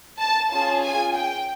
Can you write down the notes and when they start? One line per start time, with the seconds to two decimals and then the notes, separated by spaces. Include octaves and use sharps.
0.18 A5
0.49 C#4 F4 G#4 A5
0.81 G#5
1.13 G5